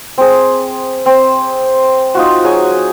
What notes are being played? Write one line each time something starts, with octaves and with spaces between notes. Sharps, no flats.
C4 G#4
C4
D#4 F4 F#4
F#3 G#4 G#5